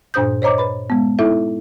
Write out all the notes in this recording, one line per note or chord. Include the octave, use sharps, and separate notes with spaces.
G2 A#2 D4 C5 D#6 G6
C5 C#5 D#5 A#5 D6
B4 B5
G#3 B3
D#4 E4 A4 E5